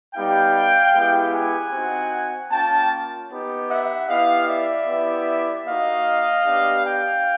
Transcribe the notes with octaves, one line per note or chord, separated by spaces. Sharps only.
G3 B3 D#4 G4 F5 G5
G#3 B3 E4 G4
F#5 G#5
C4 D#4 F#4
A#3 C#4 F4 G5 A5
B3 D#4 G4
E5 F#5
B3 E4 G4 D#5 F5
D5 E5
B3 E4 G4
A#3 D#4 F#4 D#5 F5
B3 D4 G4
F5 G5